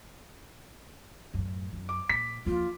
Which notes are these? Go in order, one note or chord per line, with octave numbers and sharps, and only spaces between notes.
F#2 A2
F#2
D6
A#2 B6
D#2 F3 F4